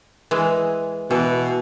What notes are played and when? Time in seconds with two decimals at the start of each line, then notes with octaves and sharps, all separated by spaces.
0.31 E3 G#3
1.11 B2 E3